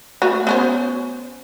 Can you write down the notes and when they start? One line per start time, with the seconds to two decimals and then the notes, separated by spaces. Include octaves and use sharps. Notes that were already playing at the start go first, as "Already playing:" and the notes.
0.22 A3 F#4
0.47 B3 C#4 C5